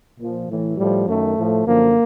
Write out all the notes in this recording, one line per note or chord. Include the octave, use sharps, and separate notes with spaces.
A#2 F3
A2 E3
A2 F3 G3
F#2 D#3 A3
A2 F3
F#2 D3 F3 A#3